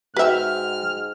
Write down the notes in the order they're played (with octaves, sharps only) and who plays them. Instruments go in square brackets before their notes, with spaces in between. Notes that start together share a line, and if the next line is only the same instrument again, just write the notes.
[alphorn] G#2 [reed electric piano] F#4 G5 [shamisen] B4 E5 [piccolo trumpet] F6